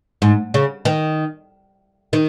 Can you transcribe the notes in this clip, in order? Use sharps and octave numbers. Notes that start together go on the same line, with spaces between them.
G#2
C#3
D#3
D#3